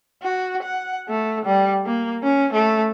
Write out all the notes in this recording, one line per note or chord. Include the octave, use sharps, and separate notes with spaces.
F#4
F#5
A3
G3
A#3
C#4
A3